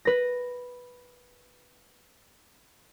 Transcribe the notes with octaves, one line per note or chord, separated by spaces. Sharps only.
B4 A#6